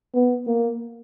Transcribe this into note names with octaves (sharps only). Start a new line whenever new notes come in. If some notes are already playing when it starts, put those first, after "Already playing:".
B3
A#3